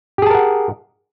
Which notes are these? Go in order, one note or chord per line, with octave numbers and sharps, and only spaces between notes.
G4 G#4 A#4 F#5 A5